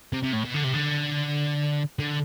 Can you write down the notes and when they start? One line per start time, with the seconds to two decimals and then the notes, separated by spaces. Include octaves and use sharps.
0.13 C3
0.23 C3
0.33 A2
0.44 B2
0.54 D3
0.64 C3
0.73 D3
1.99 D3